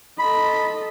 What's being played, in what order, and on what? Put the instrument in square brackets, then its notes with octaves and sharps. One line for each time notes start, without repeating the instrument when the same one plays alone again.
[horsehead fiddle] A4 D#5 [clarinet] B5